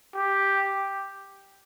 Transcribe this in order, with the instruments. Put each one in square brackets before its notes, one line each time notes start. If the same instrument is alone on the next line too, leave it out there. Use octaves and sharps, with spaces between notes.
[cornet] G4